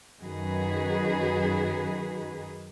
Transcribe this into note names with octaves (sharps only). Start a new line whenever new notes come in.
F#2 D#3 D#4 F#4 G#4 B4